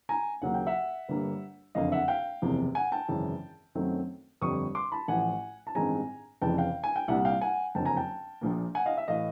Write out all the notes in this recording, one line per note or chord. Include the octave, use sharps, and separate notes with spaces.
G#5 A#5
D#2 C#3 F#3 A#3 F#5
G5
E5 F#5
G1 G2 D3 G3 A#3
F#1 F2 D3 D#5 F5
E5 F#5
F5 G5
F#1 E2 C3 F3
F#5 G#5
G5 A5
G#1 F#2 C#3 E3
F#2 D#3 F#3 A3 C4
G1 F2 D3 G3 C#6 D#6
C6 D6
A5 B5
A1 A2 F3 F#5 G#5
A5
A1 G2 D#3 G#3 C4 G#5 A#5
F1 F2 C#3 E3 G5 A5
F5 G5
G#5
G5
C2 A#2 G3 E5 F#5
F5 G5
F#5 G#5
F#1 F2 D3 F#3 G5 A5
G#5 A#5
G5 A5
A#1 A#2 F3 A#3
F#5 G#5
D#5 F5
E5
A2 E3 D#5 F5